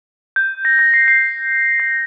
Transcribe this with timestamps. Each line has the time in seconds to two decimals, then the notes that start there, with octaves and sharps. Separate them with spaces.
0.36 G6
0.65 A#6
0.79 A#6
0.94 C7
1.08 C7
1.80 A#6